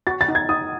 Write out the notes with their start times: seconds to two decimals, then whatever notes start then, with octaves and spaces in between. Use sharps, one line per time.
0.07 F#4 A6
0.21 A6
0.28 D#4
0.35 G#6
0.49 D#4 D#6